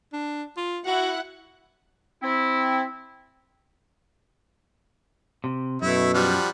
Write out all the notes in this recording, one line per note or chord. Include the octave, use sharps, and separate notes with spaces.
D4
F4
E4 F#4 F#5
C4 E4
C3
F#2 B2 A3 E4
F3 G3 F#5